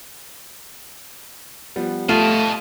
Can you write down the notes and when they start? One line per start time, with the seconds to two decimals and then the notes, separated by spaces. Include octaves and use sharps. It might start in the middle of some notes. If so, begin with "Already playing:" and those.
1.76 F3 G3 B3
2.09 A3 F4 D#5 A5